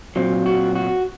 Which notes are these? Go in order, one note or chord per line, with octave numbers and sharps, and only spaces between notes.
A#2 F#3 C4 F4
F#4
F#4